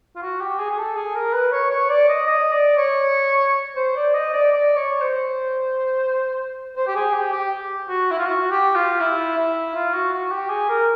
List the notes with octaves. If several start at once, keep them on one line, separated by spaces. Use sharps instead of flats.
F4
F#4
G4
G#4
G#4
A4
G#4
A#4
B4
C#5
C#5
D5
D#5
D#5
D5
C#5
C5
D5
D#5
D5
D5
C#5
C5
C5
G4
G#4
G4
G4
F#4
E4
F4
F#4
G4
F4
E4
E4
F4
F#4
F#4
G4
G#4
A#4